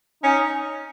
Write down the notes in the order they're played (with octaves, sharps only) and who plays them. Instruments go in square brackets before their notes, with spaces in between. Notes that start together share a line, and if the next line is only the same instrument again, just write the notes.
[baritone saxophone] C#4 [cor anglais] D#4